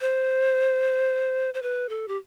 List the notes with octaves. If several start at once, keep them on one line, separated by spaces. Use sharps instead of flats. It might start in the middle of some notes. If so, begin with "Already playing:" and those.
C5
C5
B4
A4
G4